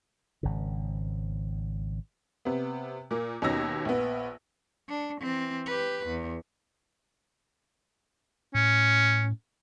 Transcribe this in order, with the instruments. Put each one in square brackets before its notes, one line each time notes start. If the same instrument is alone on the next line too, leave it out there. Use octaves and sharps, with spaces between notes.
[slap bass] G#1 C#3
[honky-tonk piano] C3 B3
A#2 A#3
D#2 B2 C#4 D#4 E6 A#6
A#1 B3
[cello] D4
E3 C4
G4 B4
E2
[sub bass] A2 [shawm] C#4